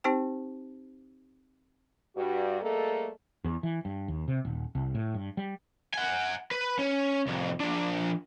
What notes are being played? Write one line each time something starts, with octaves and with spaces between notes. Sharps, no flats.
C4 D#4 G4 C5 G5
G2 F#4
G3 A3 A#3 G#4 A4 D#5
E2
E3
G2
D#2
C3
D#1
C2
A2
G2
G3
F#5 G#5
B4
C#4
C2 F2
F3 D4